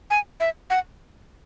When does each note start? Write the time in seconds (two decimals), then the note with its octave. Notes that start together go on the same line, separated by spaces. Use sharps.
0.10 G#5
0.40 E5
0.70 F#5